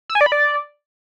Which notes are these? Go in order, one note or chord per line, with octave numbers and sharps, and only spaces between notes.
E6
G#5
D5
B5
D5